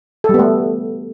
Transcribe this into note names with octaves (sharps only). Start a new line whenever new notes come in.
G3 A3 B3 A4